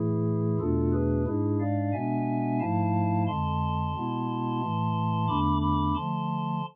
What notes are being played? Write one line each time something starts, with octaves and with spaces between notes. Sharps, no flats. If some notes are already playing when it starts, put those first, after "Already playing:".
Already playing: A2 E3 A3 E4 G#4
E2 B2 A3 D4 F4 A4
G#4 B4
G#2 G#3 D4 E4 G#4
D5 F5
B2 G#3 B3 D4 E5 G#5
G#2 F3 A3 E4 F5 A5
F2 D3 G#3 A5 C6
B2 G#3 B3 E4
A2 E3 A3
E2 D3 A3 D4 B5 D6
B5 D6
D3 F3 A3 A5 C6